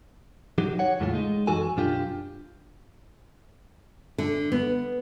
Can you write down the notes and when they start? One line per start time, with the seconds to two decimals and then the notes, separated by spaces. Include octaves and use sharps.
0.58 F#3 D#4 G4
0.79 C#5 F#5
1.00 E2 A2 C#3 A3 F4
1.14 G#3 D#4
1.47 F#2 E3 F#4 A4 G#5
1.77 B1 F#2 D4 F4 G4
4.18 D3
4.52 B3